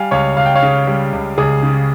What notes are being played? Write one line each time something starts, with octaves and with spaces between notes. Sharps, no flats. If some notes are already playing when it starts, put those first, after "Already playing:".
Already playing: G3 F5 G#5
C#2 C#5 F5
C#2 F5
G5
C#5 F5
C#3
G3
C#2
C#2 G#4
C#3